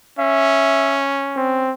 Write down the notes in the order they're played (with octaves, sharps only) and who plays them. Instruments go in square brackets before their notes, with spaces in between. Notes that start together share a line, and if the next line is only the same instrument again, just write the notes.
[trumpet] C#4 [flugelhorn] E5
[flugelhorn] C4